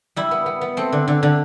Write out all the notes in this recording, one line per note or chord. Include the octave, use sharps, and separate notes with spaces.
G3 E4
B3
B3
B3
A3 C4
D3
D3
D3